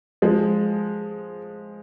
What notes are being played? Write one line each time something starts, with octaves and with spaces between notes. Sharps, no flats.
F3 G#3